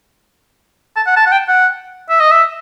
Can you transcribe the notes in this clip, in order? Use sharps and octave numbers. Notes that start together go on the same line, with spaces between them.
A5
F#5
A5
F#5
G5
F#5
E5
D#5
E5